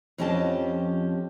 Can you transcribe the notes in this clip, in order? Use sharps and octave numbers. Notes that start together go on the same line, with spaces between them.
F2 F3 C#4 G4 D#5 A5